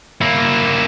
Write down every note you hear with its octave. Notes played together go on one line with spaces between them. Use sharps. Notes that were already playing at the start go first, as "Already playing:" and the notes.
A#3 E4